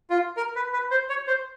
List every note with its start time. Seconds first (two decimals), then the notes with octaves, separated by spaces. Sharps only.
0.10 F4
0.37 A#4
0.56 B4
0.73 B4
0.91 C5
1.09 C#5
1.27 C5